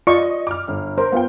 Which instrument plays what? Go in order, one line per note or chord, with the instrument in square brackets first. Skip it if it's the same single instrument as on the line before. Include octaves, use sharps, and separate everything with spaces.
[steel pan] F4 D5 C#6 [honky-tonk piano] D#5 C#7
[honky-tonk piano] D6 F6
G1
[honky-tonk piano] A#4 [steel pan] C5
[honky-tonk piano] B3 F4 G5